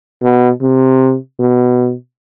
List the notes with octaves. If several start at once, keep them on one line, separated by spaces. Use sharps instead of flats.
B2
C3
B2